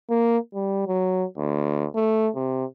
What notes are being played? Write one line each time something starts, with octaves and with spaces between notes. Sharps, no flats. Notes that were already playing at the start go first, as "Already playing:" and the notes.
A#3
G3
F#3
D2
A3
C3